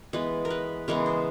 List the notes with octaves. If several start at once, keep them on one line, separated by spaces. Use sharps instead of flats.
E3 G#3 B3 B4
A#4
B4
C#3 E3 G#3 B3 A#4
C5